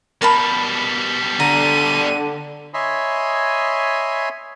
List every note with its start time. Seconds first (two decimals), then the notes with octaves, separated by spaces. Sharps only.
0.22 B2 G3 A#4 A5 B5
1.40 D3 A#5 D#7
2.74 C#5 D#5 E5 G#5 B5 C6